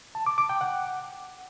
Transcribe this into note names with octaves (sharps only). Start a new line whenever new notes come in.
A5
D6
D6
G5
F#5